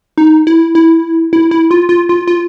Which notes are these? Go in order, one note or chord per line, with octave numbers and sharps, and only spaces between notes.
D#4
E4
E4
E4
E4
F4
F4
F4
F4